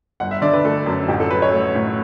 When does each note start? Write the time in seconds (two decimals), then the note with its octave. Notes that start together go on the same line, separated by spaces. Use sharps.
0.20 G1 F#5
0.31 E5
0.42 D3 D5
0.53 B4
0.64 A3 A4
0.86 F#2
1.08 A1 G4
1.20 A4
1.31 F#3 B4
1.42 C#5
1.53 A3
1.75 A2